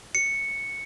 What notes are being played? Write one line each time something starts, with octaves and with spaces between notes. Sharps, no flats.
C#7